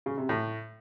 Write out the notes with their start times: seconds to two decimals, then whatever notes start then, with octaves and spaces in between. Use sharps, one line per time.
0.06 C#3
0.18 C3
0.29 A2